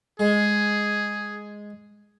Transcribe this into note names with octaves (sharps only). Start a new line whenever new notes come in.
G#3 G#4